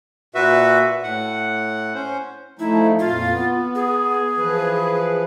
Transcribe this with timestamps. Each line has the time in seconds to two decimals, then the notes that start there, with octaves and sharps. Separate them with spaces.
0.35 A#2 F#4 B4 E5
1.03 A2 F#5
1.95 C#4 C5
2.59 F3 A3 D#4 E4
2.99 F2 A#2 F4 F5
3.27 B3
3.75 G#4
4.37 E3 F3 B4